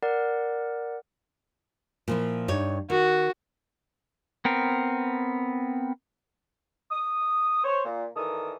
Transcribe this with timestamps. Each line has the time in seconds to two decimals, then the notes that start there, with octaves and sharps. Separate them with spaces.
0.03 A#4 D5 F#5
2.08 A#2 F3 E4
2.48 G2 D#4 C#5
2.90 D#3 F#4
4.45 B3 C4 A#4
6.91 D#6
7.64 C5 C#5
7.85 A#2
8.16 G2 D#3 E3 A4 A#4 D#6